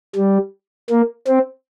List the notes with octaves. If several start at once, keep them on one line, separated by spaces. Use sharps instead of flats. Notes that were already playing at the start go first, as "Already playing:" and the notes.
G3
A#3
C4